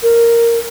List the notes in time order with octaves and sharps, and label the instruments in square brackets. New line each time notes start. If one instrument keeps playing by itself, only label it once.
[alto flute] A#4